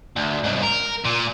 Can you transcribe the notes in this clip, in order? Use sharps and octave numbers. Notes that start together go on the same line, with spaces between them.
D2
C2 G#2
A#4
A#2